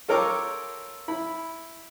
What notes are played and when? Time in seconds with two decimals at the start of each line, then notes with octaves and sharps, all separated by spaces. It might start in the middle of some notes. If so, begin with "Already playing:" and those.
0.08 F4 A4 A#4 C#5 G5 D6
1.08 E4 B5